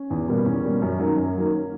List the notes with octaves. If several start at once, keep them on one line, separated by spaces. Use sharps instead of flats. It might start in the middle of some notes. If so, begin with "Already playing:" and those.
Already playing: C#4
E2
B2 G3 A#3
E2 C#4
B2 G3 A#3
F#2
D#3 F#3 A#3
F#2
D#3 F#3 A#3